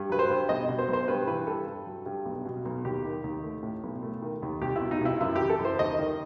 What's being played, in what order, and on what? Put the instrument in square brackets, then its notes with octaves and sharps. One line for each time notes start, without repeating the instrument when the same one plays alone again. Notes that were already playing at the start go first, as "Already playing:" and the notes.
Already playing: [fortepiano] G2
F#3 B4
C5
G2
B1 D#5
B2
C5
B1
C5
G2 B4
E3 B4
G2 A4
G2
F#3
G2
B1
B2
B1
D#2 G4
D#3
D#2
A3
A2
B1
A3
D#3
D#2
C2 G4
E4
B2
D#4
C2 E4
F#2 E4
E3 G4
A4
F#2
C5
D#2 D#5
D#3